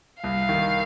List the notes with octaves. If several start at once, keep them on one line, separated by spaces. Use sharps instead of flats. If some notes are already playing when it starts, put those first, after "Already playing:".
C2 F5
D#3